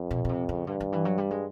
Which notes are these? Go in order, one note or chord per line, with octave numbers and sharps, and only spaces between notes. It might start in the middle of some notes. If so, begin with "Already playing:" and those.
Already playing: F2
B2
B2
C3
C#3
G2 D3
D#3
E3
F#3
G3
G#3